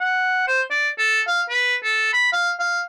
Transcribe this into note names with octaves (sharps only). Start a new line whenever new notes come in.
F#5
C5
D5
A4
F5
B4
A4
B5
F5
F5